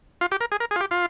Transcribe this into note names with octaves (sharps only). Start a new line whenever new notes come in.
F4
G4
A#4
G#4
A#4
G#4
F4
G4
F4